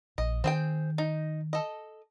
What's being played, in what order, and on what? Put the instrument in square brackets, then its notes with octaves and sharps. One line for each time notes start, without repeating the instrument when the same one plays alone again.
[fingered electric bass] A#1 [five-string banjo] D#5
[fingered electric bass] D#3 [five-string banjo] C4 G#4 G5
[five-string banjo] D#4
A4 D#5